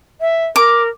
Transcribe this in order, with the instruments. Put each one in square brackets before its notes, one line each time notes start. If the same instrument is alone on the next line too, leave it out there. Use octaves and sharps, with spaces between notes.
[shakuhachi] E5
[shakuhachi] A#4 [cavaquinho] D6